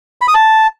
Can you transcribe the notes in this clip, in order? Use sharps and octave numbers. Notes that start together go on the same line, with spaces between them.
B5
D#6
A5